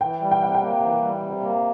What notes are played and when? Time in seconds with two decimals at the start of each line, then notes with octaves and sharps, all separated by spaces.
0.01 E3 G5
0.22 G3
0.31 G5
0.42 C3 F#5
0.55 G5
0.61 A#3
0.81 E3
1.02 G3
1.22 C3
1.41 A#3